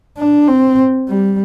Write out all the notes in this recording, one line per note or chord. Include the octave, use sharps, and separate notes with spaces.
D4
C4
G3